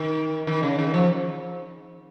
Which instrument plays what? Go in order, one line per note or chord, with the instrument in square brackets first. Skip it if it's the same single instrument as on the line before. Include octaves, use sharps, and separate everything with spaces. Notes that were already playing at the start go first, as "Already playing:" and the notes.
Already playing: [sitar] D#3
D#3
C#3
D#3
F3